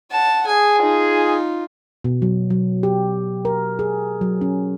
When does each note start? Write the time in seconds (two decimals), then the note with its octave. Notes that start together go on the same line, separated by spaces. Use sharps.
0.11 F#5 A5
0.47 G#4 G#5
0.79 D#4 F4
2.04 B2
2.22 F#3
2.50 F#3
2.83 G4
3.45 A#4
3.79 G#4
4.21 F#3
4.41 C#4